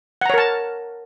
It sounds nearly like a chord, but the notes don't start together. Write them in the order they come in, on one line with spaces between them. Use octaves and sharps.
F#5 A#5 C#5 A#4 A5